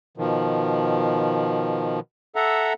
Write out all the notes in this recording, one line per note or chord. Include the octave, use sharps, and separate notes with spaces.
B2 D#3 F3
A4 E5 F#5 A#5